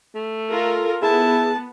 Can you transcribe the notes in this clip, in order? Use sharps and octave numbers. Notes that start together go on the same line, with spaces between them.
A3
F4 A4 A#4
B3 E4 G#4 A5